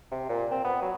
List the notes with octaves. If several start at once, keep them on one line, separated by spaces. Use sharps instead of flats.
C3
A#2
C4
B3
F#3